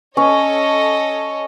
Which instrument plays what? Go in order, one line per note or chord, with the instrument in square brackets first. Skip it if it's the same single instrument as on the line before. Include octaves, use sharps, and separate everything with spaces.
[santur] C#4 [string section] A4 C#5 D#5